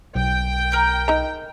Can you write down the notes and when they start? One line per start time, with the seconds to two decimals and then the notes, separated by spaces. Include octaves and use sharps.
0.15 B1 G5
0.72 A#4 G6
1.08 D#4 A#5